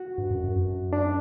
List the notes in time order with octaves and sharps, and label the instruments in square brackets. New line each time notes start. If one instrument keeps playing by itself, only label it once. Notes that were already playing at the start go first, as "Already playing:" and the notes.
Already playing: [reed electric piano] F#4
[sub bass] G2
F#2
F#2
F#2
[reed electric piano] D4